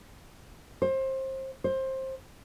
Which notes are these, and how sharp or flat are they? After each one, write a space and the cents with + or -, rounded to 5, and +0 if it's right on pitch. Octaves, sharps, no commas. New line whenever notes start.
C5 +25
C5 +20